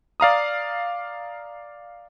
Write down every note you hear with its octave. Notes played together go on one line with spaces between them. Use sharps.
D5 F5 A#5 D#6